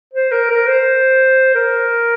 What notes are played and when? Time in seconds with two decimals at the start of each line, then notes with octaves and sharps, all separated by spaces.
0.14 C5
0.32 A#4
0.50 A#4
0.67 C5
1.55 A#4